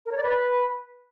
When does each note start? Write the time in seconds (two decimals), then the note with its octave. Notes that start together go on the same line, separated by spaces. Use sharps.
0.06 A#4
0.11 C#5
0.17 D5
0.23 B4